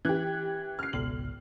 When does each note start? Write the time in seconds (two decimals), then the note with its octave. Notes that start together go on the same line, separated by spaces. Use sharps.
0.05 E3 G4 F#6 G#6
0.79 F6 C7
0.93 G#1 C#2 B2 F#7